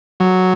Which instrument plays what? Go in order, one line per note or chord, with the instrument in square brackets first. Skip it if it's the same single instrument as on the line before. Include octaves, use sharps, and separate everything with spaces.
[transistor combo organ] F#3